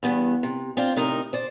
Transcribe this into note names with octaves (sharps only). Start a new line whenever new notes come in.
E2 G2 B3
C3
C4 D4 F4
A2 C3 D#4 A#4
C5 D5